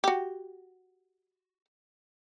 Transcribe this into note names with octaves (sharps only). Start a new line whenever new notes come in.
F#4 G4